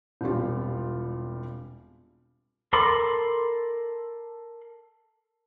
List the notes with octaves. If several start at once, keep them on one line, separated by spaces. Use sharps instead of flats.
E1 C2 G3 F4
A4 A#4 B5 C6 D6